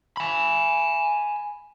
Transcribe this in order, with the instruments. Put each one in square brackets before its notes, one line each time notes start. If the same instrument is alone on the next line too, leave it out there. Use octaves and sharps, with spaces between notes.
[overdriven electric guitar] G#5 B5